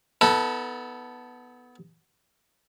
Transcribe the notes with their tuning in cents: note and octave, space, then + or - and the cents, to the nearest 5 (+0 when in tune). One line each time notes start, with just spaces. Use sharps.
B3 +0 D#4 +45 A4 +0